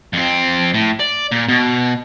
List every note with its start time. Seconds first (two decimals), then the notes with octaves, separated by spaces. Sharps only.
0.13 F2 C4
0.74 A2
1.00 D5
1.31 A#2
1.48 B2